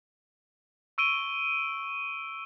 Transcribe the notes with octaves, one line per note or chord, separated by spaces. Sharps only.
C#6 E6 D7 D#7 G7